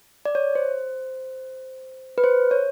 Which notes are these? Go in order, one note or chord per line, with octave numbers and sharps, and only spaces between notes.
D5
C#5
C5
B4
C5
C#5